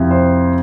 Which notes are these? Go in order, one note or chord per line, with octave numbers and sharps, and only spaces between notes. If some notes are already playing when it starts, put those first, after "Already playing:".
Already playing: F2 C3 F3 C4 E4
C5